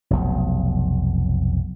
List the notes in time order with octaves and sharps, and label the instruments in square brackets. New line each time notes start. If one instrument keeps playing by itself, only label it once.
[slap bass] F1 B1